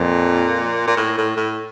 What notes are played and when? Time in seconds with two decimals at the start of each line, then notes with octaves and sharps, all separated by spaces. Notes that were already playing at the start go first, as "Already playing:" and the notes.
Already playing: F2 A#2
0.87 A#2
0.97 A2
1.18 A2
1.37 A2